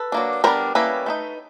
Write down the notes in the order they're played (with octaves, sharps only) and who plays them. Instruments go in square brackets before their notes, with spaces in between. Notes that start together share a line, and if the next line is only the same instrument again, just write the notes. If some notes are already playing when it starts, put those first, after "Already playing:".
Already playing: [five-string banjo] A4 B4
F#3 A#3 D4
G3 B3 D4 A#4 C5
G3 A#3 C#4 E4 A4 B4
A3 C4 D#4